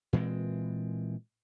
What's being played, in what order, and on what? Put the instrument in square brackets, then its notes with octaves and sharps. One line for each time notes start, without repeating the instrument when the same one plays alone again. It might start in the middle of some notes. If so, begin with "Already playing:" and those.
[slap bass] A#2 E3 G#3 C4